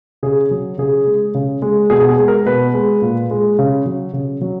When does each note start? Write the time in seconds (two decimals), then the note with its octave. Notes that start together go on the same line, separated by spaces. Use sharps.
0.23 C#3 G#4
0.51 F#3
0.78 C#3 G#4
1.06 G#3
1.34 C#3
1.62 G#3
1.90 B2 G#4
2.09 G#4
2.18 G#3
2.28 A#4
2.46 B2 B4
2.74 G#3
3.02 A#2
3.31 G#3
3.59 C#3
3.86 F#3
4.13 C#3
4.41 F#3